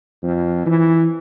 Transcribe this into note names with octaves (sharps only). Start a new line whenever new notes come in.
F2
E3